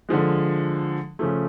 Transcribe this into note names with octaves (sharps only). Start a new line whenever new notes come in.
D3 F3 G#3
C#3 F3 A3